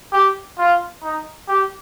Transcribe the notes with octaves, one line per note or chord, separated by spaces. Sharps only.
G4
F4
D#4
G4